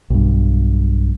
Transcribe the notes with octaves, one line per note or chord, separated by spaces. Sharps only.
B1 G2